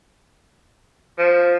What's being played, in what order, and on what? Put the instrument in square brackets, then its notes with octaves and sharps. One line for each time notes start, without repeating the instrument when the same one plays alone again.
[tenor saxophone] F3